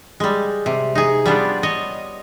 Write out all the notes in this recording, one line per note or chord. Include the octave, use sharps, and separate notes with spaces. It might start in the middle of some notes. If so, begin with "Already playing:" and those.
G3 G#3
C3
D#4 G#4
G3 B3 D4 F4
C#5 D#5